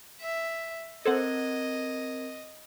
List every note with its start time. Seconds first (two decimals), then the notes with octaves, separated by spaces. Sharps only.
0.20 E5
1.05 C4 A4 A#4 C5 D#5 F#5 G#6